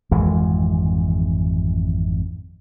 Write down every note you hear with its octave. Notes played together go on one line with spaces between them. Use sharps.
G#1 F2 E3 G#3